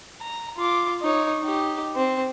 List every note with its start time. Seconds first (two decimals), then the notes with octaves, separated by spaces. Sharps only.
0.21 A#5
0.57 F4 D6
1.02 D#4 C#5
1.41 D#4 G4
1.95 C4